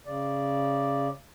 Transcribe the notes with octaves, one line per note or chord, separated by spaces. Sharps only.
C#3 D5